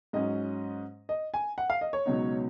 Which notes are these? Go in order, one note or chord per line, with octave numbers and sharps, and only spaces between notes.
G#2 F#3 C#4 D#5
D#5
G#5
F#5
F5
D#5
C#5
C#2 B2 F#3 B3 D#4